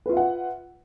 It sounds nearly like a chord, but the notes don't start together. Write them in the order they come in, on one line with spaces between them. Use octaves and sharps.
B4 F4 E5 F#5